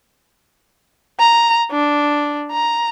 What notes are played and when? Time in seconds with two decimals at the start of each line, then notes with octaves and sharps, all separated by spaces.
1.19 A#5
1.72 D4
2.52 A#5